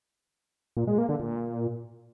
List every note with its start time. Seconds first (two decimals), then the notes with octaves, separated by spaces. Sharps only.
0.77 A#2
0.87 G#3
0.98 A#3
1.09 D3
1.20 A#2